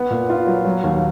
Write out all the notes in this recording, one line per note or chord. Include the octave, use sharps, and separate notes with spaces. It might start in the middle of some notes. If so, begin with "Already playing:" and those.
Already playing: B3
A#2
F4
F#3
F#3
D#2